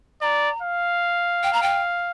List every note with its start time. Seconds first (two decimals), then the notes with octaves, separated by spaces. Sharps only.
0.21 D5 A#5
0.62 F5
1.43 G5
1.53 A#5
1.62 G5